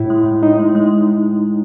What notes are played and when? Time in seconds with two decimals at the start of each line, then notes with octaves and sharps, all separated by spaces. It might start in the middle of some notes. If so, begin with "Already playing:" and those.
Already playing: A2 E4
0.10 G#3
0.25 A2
0.43 A2 D#4
0.59 G#3
0.75 G#3